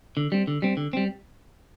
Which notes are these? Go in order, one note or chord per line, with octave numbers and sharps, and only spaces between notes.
D3
G3 C4
D3
G3 C4
D3
G3 C4